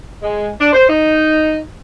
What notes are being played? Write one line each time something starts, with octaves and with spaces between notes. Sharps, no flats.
G#3
D4
C5
D#4